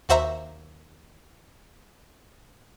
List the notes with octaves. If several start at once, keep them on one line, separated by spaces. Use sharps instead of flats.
D#2 F#4 C5 E5 A#5